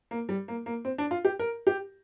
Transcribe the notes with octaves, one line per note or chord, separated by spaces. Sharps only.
A#3
G3
A#3
A#3
C4
D4
F4
G4
A#4
G4